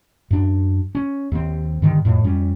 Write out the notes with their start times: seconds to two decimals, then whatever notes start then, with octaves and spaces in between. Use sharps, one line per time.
0.31 F#2 D4
0.95 C#4
1.32 D#2 C4
1.82 G2 D3 D#3
2.05 F2 A2
2.24 F2 G3 C#4